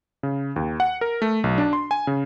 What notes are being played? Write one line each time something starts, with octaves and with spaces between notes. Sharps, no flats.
C#3
D#2
F#5
A#4
A3
B1
D4
C6
G#5
C#3